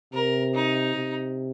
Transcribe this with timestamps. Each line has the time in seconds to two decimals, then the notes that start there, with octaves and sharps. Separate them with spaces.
0.13 C3 A#4
0.54 D#4
0.96 C3